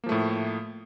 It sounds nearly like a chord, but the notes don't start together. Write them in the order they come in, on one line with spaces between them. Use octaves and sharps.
A#3 F3 A3 A2